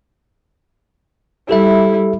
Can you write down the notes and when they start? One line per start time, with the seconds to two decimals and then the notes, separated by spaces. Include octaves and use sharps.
1.49 G3 E4 G4 A4 E5